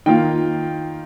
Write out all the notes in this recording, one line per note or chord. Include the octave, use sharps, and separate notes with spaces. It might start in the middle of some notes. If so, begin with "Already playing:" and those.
D#3 A#3 F4 G5